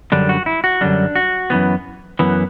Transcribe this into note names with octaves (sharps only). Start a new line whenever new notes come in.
F#2 D3 G3 D4
F#4
E4
F#4
F#2 D3 G3 D4
F#4
F#2 E3 B3
F#2 E3 B3